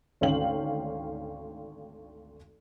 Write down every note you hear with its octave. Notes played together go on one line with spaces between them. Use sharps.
G#1 D2 C#4 F5 G5 F#7